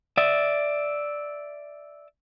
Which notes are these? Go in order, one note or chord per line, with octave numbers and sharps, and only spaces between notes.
D5 E5